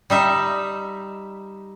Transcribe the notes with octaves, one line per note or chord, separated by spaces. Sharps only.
G3 D#4 E5